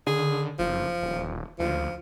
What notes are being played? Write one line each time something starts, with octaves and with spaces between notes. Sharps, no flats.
D3 G#4
F#1 F3
D#1
D2 F3